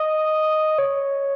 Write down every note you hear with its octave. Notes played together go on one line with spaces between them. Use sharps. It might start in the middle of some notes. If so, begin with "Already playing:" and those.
Already playing: D#5
C#5